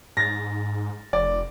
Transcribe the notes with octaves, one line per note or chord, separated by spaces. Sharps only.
G#2 A6 A#6
F1 D5